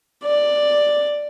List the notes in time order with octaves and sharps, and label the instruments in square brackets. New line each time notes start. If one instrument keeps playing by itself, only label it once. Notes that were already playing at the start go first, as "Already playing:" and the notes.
[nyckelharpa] D5